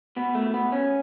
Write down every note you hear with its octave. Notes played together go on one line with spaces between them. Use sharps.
B2 B3
A3
B3
C#4